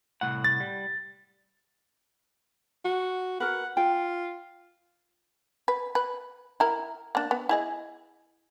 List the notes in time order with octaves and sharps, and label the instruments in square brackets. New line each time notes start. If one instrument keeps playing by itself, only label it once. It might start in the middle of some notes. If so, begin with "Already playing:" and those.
[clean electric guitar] C2 A2 F#5
[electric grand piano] A6
[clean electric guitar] G3
[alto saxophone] F#4
[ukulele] F#4 A#4 B4 [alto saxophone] F#5
[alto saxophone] F4 [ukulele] G5
[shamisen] B4
B4
E4 A#4
A#3 D4
B3
E4 G#4 D#5